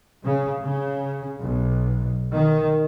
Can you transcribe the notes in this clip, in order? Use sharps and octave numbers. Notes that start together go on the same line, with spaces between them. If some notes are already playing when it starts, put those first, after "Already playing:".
C#3
C#3
B1
D#3